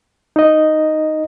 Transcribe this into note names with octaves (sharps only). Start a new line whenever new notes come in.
D#4 D#5